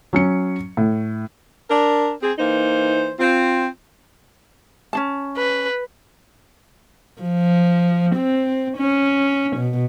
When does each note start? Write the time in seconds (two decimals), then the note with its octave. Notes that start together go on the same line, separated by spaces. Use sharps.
0.13 F#3 C#4 C#7
0.77 A2
1.70 D4 A#4
2.22 C4 G#4
2.39 E3 A#3 D#4 C5
3.19 C4 F4
4.93 C#4 D4 A5
5.37 B4
7.22 F3
8.15 C4
8.77 C#4
9.56 B2